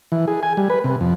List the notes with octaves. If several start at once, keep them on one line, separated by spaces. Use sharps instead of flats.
E3
G#4
G#5
G3
B4
C3
F2